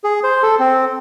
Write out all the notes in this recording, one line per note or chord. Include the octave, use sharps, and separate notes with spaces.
G#4
C5
A4
C4